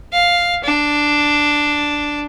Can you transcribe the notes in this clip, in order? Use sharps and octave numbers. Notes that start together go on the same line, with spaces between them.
F5
D4